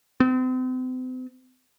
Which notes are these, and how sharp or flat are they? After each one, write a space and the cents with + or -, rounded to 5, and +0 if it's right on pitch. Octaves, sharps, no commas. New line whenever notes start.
C4 -40